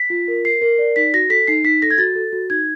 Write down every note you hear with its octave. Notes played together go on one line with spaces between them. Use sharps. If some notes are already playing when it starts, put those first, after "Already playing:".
Already playing: B6
F4
A#4
A#4 C7
A#4
D5
D#4 B6
F#4 A#6
A4 B6
D#4 C7
D#4 B6
A4 A#6
G#6
F#4 A6
A4
F#4
D#4 G#6